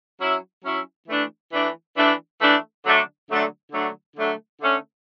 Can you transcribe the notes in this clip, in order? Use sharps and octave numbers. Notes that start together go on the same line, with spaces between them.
F#3 C#4 E4
F#3 C#4 E4
E3 A3 D4
E3 A3 D4
E3 A3 D4
E3 A3 D4
D3 F#3 A3 D4
D3 F#3 A3 D4
D3 F#3 A3 D4
D3 F#3 A3 D4
D3 A3 C#4